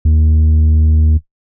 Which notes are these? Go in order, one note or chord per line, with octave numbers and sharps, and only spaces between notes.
D#2